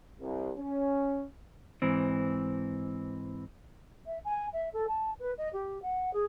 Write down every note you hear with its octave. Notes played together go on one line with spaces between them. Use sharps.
C2
C#4
G#2 E3 C4
E5
G#5
E5
A4
A5
B4
D#5
G4
F#5
G#4